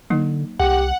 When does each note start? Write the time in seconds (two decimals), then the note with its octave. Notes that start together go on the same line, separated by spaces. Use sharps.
0.10 D3 F#3 A#3 D#4
0.59 C2 G4 F#5